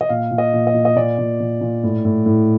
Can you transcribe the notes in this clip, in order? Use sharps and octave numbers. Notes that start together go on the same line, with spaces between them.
D#5
A#2 F5
A#2
D#5
A#2
D#5
A#2
D#5
A#2 D5
A#2
A#2
A#2
A2
A2
A2